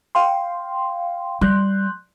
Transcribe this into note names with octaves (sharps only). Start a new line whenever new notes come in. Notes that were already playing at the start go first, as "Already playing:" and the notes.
F5 G5 C6
G3 C6 F#6 G6